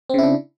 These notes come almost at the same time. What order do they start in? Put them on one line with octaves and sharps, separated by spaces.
C4 C#3 E4 D4